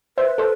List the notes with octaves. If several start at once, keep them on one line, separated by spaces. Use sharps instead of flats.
B4 C5 E5
A4 C5